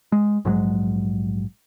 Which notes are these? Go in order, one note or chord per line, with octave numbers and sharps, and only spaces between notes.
G#3
A#1 G#2 F#3 G#3